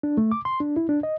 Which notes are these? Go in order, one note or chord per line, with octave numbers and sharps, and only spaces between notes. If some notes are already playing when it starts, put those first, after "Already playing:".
D4
A3
D6
C6
D4
E4
D4
D#5